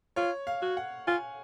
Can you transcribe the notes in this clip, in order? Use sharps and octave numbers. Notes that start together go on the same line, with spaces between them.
F4 C#5
F5
F#4
F#5
F4 G#5